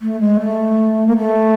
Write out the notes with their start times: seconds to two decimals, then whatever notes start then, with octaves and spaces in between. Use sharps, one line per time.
0.02 A3
0.21 G#3
0.40 A3
1.07 A#3
1.18 A3